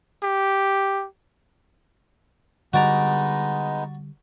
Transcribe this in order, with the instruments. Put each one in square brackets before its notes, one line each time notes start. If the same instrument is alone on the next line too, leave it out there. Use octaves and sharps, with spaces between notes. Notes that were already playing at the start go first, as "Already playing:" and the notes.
[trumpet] G4
[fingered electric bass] D3 G3 [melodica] G#3 B3 D#4 [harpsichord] F#4 D5 A#5